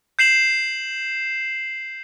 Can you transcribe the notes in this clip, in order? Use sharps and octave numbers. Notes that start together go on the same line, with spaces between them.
G6 C7 E7 F#7